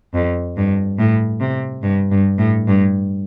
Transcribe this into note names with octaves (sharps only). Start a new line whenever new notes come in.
F2
G2
A2
C3
G2
G2
A2
G2